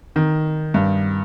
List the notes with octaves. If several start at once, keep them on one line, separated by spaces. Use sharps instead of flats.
D#3
G2